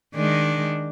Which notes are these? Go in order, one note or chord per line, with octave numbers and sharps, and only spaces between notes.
D#3 G#3 D4